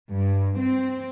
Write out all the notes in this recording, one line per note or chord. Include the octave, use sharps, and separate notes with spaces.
G2
C4